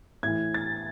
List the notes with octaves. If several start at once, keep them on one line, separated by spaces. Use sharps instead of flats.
A2 E3 G#6
A6